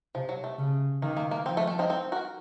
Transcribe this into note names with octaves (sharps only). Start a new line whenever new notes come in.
C3 F3
F#3
A3
C#3
D#3 A#3
A#3
A#3
F3 C4
A3
A3
C4 D#4
C4
F#4 A#4